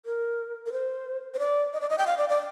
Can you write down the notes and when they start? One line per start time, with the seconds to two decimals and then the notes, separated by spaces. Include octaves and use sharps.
0.06 A#4
0.66 A#4
0.72 C5
1.34 C5
1.39 D5
1.73 D#5
1.81 D5
1.90 D#5
1.98 G5
2.07 F5
2.18 D5
2.29 D5